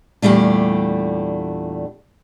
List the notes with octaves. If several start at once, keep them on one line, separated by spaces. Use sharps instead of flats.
E2 A#2 G3 A3 D4